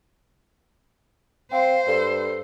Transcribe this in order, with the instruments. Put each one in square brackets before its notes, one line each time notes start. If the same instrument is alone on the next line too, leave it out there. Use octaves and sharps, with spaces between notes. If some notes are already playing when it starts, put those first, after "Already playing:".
[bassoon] C4 [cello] C5 [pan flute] F5
[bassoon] G2 [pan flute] A4